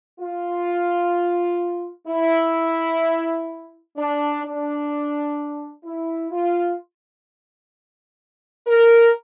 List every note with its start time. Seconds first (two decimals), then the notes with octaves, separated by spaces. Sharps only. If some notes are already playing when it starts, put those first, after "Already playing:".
0.20 F4
2.08 E4
3.97 D4
4.44 D4
5.84 E4
6.31 F4
8.67 A#4